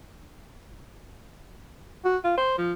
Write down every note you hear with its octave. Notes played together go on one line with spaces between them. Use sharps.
F#4
F4
C5
F3